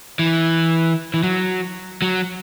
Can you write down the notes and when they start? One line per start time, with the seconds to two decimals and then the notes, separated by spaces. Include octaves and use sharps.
0.19 E3
1.14 E3
1.23 F#3
2.02 F#3